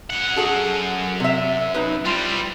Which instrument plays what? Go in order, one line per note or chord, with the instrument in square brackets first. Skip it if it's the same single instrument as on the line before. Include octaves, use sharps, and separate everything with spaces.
[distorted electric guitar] F#2 F#5
[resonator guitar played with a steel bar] F#4 G#4 A4
C3 E5
D#4 B4
[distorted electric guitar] G3 C4 [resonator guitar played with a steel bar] F4